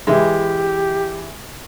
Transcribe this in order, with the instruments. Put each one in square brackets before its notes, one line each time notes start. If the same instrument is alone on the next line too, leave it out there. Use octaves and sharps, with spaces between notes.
[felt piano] E3 E4 [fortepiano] G#3 [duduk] G4